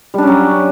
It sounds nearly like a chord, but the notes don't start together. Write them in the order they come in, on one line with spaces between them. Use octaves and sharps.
G3 D4 C#4 F#3